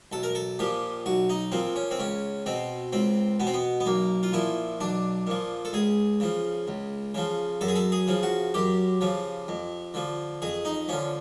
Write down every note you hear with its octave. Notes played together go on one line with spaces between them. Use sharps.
B1 A4
A#4
A4
A#2 F3 G4
B1 F#4
D#4
A#2 F3 C4
C#4
C4
C#2 C#4
B2 C4
C#2 C4
B2 B3
C4
B3
B3
B1 A#3
F4
A#2 F3 E4
B1 D4
A#2 F3
A4
C#2 G#4
C#3 F3
C#2
C#3 F3
F#2 A4
G#4
A4
G#4
C#3 F3
F#4
F#2 G4
C#3 F3
F2
D3 F3
F2 G#4
D#4
D3 F3 C#4